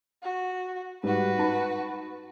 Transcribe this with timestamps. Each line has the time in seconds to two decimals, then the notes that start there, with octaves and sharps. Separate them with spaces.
0.23 F#4
1.03 G#2 G3 F#4 B4
1.38 D#4 A5 B5